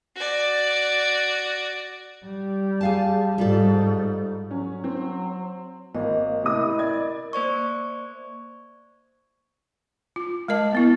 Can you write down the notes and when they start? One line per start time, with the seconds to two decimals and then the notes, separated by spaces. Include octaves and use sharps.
0.16 F#4 D5
2.26 G3
2.81 G#4 F5 A5
3.38 G#2 G3 F4 A4
4.51 F#3 C#4
4.84 C4
5.95 G#1 A#3 A#4 D#5
6.43 A1 C3 E4 D#6
6.79 D5 G#6
7.33 A#3 C5 D5 C#6
10.16 F4
10.48 G#3 A#4 D#5 A5
10.73 A#3 B3 E4